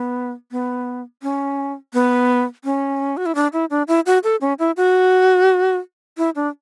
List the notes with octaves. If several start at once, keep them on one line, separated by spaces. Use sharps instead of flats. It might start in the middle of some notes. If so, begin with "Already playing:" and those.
Already playing: B3
B3
C#4
B3
C#4
F#4
E4
D4
E4
D4
E4
F#4
A4
C#4
E4
F#4
E4
D4